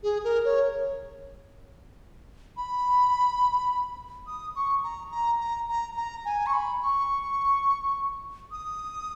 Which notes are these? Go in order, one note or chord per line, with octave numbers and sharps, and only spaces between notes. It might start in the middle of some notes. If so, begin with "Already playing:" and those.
G#4
A#4
C#5
B5
D#6
C#6
A#5
A#5
A#5
A#5
A#5
G#5
C#6
B5
C#6
D#6